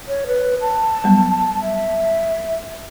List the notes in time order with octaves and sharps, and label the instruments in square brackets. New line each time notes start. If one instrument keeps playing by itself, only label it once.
[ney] C#5
B4
A5
[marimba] F#3 G3 B3
[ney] E5